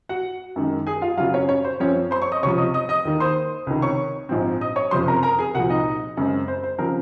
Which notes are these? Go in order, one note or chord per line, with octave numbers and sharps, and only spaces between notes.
F#4 F#5
F#2 D#3 G#3
G#4 G#5
F4 F5
F#2 C#3 F#3 F4 F5
C#4 C#5
C#4 C#5
C5
F#2 F3 C4 C#4 C#5
C5 C6
C#5 C#6
D#5 D#6
C#2 C3 F3 C#5 C#6
D#5 D#6
D#5 D#6
D#5 D#6
D#2 D#3 A#3
C5 C6
C#2 C3 D#3
C#5 C#6
A#1 G#2 F3 C4
D#5 D#6
C#5 C#6
F#1 F2 C3 F3 C5 C6
A#4 A#5
A#4 A#5
G#4 G#5
C2 A#2 F3 F#4 F#5
D#4 D#5
F#2 C#3 G#3 C4
C5
C5
C#3 F3 C4 A#4